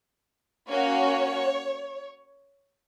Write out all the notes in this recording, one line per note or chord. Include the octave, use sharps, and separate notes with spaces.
A#3 C#4 F#4 C#5